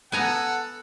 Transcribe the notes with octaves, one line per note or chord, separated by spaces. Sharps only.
B3 A4 F#5 G#5 A#5